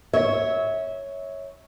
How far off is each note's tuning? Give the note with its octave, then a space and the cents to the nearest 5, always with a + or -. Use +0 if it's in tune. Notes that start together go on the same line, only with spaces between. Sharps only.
C#5 +0 E5 -25